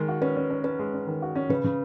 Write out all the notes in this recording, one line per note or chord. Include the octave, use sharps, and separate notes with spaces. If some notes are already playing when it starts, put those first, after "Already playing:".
Already playing: D#3 G#3
F#4
C#4 B4
C#4
C#4
C#4 B4
G#3
C#4
D#3
F#4
C#4
C#3 B4
C#3